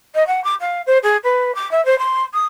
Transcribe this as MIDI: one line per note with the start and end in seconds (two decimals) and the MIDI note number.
0.15 0.26 75
0.27 0.42 78
0.44 0.54 86
0.60 0.82 77
0.86 0.98 72
1.03 1.17 68
1.24 1.55 71
1.55 1.70 86
1.71 1.84 76
1.85 1.97 72
1.99 2.22 84
2.33 2.45 87